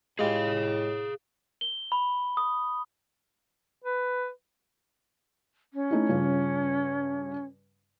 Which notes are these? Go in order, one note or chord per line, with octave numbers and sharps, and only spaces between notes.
A2 G#3 F4 G4 G#4 F5
G7
B5
D#6
B4
C#4
A3 D#4 E4
G2 C#3 F4